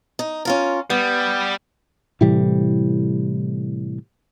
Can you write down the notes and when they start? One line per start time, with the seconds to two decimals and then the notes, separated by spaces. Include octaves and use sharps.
0.19 D#4
0.45 C#4 F4 A#4
0.90 G3 B3
2.21 A2 C3 E3 G3